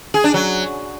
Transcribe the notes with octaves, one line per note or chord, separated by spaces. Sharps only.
G#4
D4
F#3